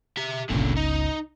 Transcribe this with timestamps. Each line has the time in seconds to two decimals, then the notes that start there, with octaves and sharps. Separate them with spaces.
0.17 G4 E5
0.50 G1 C#2 A#2 D3
0.77 D#4